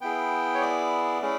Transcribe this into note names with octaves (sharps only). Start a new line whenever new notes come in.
B3 E4 G#4 G5
C#5
D5
A3 C#4 E4 G#4